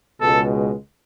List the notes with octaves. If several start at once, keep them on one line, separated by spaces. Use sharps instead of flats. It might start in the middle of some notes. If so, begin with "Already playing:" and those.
C#2 B2 G#3 A4